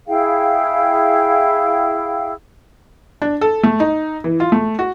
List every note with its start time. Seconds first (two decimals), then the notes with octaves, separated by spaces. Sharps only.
0.07 E4 G#4 F5 G5
3.22 D4
3.41 A4
3.63 A3
3.80 D#4
4.24 E3
4.40 F4
4.52 A3
4.79 F#4